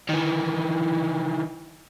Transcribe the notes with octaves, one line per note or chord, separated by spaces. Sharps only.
D#3 E3